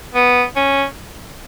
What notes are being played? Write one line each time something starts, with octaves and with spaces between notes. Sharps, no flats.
B3
C#4